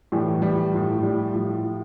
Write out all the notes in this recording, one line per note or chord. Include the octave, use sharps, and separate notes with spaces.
A2 E3 G3
G3
A2 F3
G3
A2 F3
F3